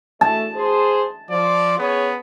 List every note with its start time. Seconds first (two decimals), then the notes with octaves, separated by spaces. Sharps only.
0.21 A3 A5
0.54 G#4 C5
1.30 F3 D5
1.78 B3 C#4 G#4 C#5